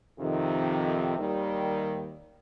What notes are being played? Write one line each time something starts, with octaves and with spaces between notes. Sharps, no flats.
F2 C3 D#3
D#2 D#3 G3